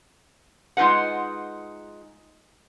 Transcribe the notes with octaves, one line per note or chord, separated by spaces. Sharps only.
G#3 D#4 F4 B4 F#5